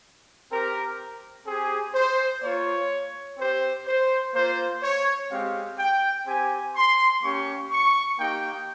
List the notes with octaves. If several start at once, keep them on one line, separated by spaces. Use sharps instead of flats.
C4 G4 A#4
C4 G4 G#4
C5
A#3 F4 C#5
C4 G4 C5
C5
A#3 F4 C5
C#5
G#3 C4 G4 F5
G5
C4 G4 G#5
C6
A#3 C#4 G4 C#6
C#6
A#3 D#4 G4 G5